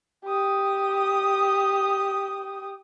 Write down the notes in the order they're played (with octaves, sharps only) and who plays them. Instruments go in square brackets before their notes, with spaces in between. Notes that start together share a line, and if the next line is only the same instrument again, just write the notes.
[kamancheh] G4 D#6